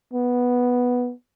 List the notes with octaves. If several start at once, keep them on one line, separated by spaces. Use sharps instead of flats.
B3